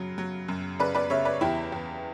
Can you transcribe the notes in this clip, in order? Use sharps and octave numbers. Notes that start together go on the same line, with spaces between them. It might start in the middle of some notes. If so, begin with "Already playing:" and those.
Already playing: F#2 C#3 F#3
F#3
F#2
C#3 B4 D5
B4 D5
C#3 C#5 E5
B4 D5
E2 E4 G4
E2